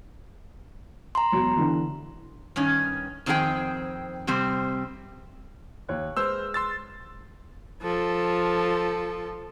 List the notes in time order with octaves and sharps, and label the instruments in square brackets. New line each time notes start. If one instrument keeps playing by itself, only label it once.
[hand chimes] A#5 C6
[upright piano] E1 F#3
D3 E3
[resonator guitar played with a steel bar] G2 D#3 C#4
F2 D#3 C4 D4 G#4 G5
C3 G3 C4
[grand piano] D#2 C#5 F#6
[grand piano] G#3 B4 F6 [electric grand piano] C5 E6
[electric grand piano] C6 E6 A6
[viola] F3 A4